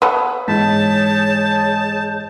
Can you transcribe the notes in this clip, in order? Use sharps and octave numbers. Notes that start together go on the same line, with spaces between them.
B3 A4 C#5 F5 D#6
G#2 E3 G#4 C#5 A5 G6 B6